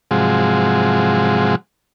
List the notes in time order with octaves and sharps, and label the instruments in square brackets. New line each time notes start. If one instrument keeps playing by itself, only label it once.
[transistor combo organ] G#2 C3 F3 F#3 G#3